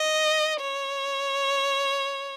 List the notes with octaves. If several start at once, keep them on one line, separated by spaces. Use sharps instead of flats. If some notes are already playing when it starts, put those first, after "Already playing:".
Already playing: D#5
C#5